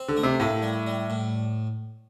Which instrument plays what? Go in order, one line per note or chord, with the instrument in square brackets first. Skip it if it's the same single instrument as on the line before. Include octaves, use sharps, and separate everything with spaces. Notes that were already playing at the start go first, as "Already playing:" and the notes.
Already playing: [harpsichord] C4
[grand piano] D3
[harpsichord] A3
[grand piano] C3
[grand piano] A2 [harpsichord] A#3
[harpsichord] G3
G3
A2